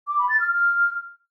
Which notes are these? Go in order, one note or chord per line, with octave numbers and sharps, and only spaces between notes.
D6
B5
A6
F6
F6